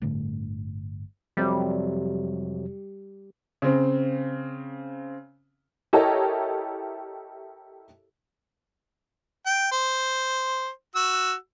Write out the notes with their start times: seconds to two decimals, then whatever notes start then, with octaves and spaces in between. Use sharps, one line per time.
0.02 G1 A2 D3 A3
1.37 F2 C3 F#3 G3
3.62 C#3 C4
5.93 E4 G4 A4 A#4 C#5 D#5
9.46 G5
9.72 C5
10.96 F#4 E6